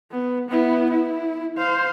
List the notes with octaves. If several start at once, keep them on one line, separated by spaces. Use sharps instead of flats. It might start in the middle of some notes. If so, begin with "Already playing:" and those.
B3
B3 E4
E4
C5 F5